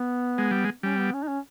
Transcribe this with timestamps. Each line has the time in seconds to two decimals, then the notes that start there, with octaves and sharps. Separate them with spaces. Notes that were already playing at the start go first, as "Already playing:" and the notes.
Already playing: B3
0.38 G#3
0.51 G3
0.64 G#3
0.83 G3 C#4
0.98 B3
1.13 C#4
1.23 D#4
1.28 C#4